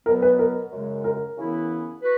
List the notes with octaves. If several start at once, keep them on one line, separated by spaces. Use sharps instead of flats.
B2 F#3 B3 A#4
B4
A#4
F#2 C#3 G#3
A#4
F#2 C#3 E3 B3 E4
F#4 B4